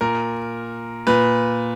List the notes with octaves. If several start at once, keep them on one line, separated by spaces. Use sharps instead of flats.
A#2 A#4
A#2 B4